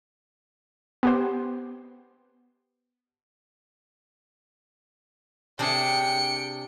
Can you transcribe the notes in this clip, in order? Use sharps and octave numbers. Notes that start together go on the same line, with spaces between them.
B3 G4 C5
C3 D4 G#4 G5 C#7